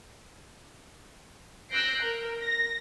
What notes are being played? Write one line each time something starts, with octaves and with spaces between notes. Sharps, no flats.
E6 F#6 G6 A#6 C7 D7
A#4
A#6